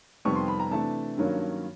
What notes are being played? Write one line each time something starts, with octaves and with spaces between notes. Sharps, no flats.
F2 C3 D#3 G3 B3 C#6
C6
B5
A#5
C3 E3 A3 D4 A5
G2 D#3 F#3 A#3 C#4